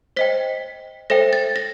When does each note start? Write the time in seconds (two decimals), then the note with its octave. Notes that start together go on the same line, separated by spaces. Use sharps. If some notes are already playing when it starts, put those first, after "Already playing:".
0.16 C5 D#5 G5 B6
1.10 A4 C5 E5 G5 A#6
1.33 A6
1.56 A#6